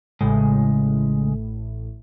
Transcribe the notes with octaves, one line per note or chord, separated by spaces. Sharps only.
A1 A2 C#3 G#3